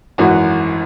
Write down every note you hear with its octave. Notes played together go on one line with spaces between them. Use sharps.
G#1 F#2 E3 F#4